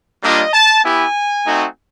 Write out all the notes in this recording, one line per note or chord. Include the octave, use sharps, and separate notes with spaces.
G3 A#3 D4 F4 D#5
A5
B3 E4 G4 G#5
A3 C4 D#4 F#4